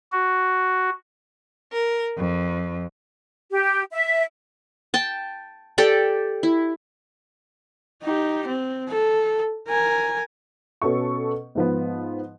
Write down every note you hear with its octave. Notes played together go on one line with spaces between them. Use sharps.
F#4
A#4
F2
G4
E5
G5 A5
G4 A4 D5 G5
E4
D#4 G4
C4
A4
A#4 G#5
B2 C#4 A4 C#6
G#2 F3 B3